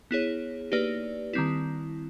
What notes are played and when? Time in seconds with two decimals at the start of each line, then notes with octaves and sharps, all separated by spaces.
0.11 B3 E4 G#4 C#5
0.72 A#3 D#4 G4 B4 D5
1.33 D#3 G3 C4 E4